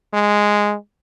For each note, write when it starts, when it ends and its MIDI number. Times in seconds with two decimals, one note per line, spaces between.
0.14 0.75 56